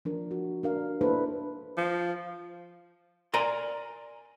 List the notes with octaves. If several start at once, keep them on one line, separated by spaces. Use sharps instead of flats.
F3 D4 A#4
F#4
D4 A#4 F5
A#3 D4 E4 A4 B4 C5
F3
A#4 D5 G#5 A#5 C6